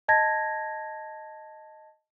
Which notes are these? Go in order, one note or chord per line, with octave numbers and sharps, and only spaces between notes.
D#5 A5 G#6 A#6